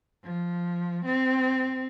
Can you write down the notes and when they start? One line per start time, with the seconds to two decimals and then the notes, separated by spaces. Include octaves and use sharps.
0.24 F3
1.05 C4